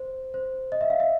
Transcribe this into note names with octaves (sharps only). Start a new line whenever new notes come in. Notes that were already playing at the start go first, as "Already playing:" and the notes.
Already playing: C5
C5
D#5
E5
F5
E5